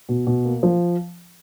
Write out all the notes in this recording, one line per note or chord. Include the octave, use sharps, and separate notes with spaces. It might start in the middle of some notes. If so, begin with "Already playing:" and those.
B2
B2
A#3
F3